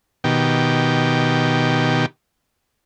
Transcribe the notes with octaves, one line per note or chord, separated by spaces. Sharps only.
B2 D#3 G4